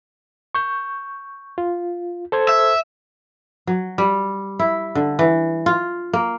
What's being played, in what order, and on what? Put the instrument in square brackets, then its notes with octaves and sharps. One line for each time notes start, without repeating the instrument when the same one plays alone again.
[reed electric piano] C#6 G6
F4
A4 C5 G#6
[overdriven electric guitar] E5
[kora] F#3
G3
E4
D3
E3
F4
A#3